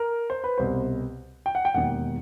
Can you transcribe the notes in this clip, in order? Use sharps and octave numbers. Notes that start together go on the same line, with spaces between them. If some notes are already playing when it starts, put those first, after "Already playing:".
Already playing: A#4
C5
B4
C2 B2 C5
G5
F#5
G5
E1 D#2 D#3 F#5